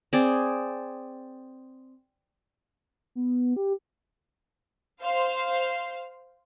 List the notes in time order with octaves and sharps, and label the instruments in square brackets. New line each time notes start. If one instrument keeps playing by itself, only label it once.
[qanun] C4 G#4 D5
[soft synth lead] B3
G4
[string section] C5 F5